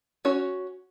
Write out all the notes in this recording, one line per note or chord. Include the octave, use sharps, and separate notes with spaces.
C#4 F#4 C#5